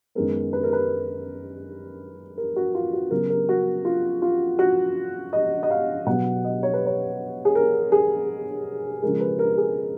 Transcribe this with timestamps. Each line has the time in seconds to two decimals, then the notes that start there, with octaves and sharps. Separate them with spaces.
0.15 F#2 D#3 G#3 B3 A#4
0.53 B4
0.63 A#4
0.73 B4
2.38 A#4
2.56 F#4
2.75 F4
2.93 F#4
3.11 C#3 F#3 B3 A#4
3.30 A#4
3.49 F#4
3.85 F4
4.22 F4
4.59 F#4
5.33 D#5
5.63 D#5
5.71 F5
6.07 B2 F#3 B3 F#5
6.44 D#5
6.63 C#5
6.74 B4
6.86 C#5
7.45 G#4
7.55 A#4
7.92 G#4
9.02 C#3 F3 G#3 A#4
9.20 B4
9.39 A#4
9.58 G#4